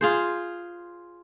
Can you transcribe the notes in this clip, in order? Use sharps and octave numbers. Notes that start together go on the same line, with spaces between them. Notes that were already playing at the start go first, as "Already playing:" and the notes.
F4 G#4 C5